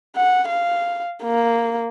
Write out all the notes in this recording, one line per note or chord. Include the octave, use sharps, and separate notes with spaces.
F#5
F5
A#3